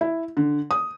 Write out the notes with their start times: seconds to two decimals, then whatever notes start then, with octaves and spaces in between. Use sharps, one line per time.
0.01 E4
0.37 D3
0.71 D#6